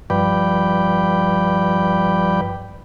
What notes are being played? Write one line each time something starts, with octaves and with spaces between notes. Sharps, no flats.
G2 F3 B4 D5 G5